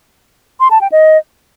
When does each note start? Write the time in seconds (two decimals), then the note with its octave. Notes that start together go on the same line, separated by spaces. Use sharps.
0.60 C6
0.71 A5
0.81 G5
0.92 D#5